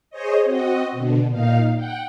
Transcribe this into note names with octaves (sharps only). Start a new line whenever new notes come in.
G#4 C5 C#5 D#5
C4 F#4 D#5
B2 D3
A#2 D#4 F5
F#5 G5